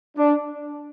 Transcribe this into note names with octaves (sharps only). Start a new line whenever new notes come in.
D4